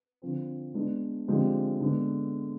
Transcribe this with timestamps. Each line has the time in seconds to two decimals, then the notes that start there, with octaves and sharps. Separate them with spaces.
0.22 D3 F3 C4
0.74 G#3 B3 D4
1.28 D3 F3 G#3 C4 G4
1.81 D3 G#3 B3